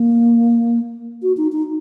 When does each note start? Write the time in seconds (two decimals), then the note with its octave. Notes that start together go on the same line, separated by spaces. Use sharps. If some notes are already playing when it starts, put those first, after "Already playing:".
Already playing: A#3
1.23 F#4
1.37 D#4
1.52 D#4